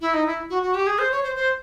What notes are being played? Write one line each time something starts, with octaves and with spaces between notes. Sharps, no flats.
E4
D#4
E4
F#4
F#4
G4
G#4
C5
C#5
C5
C5